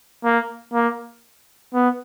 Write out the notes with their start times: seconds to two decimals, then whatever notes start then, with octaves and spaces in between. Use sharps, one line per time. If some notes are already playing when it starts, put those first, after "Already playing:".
0.25 A#3
0.74 A#3
1.74 B3